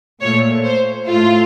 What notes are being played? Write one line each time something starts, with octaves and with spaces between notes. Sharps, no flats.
A#2 A3 C#5
C5
A2 A3 F4